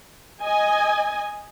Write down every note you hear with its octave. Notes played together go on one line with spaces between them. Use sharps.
D#5 G#5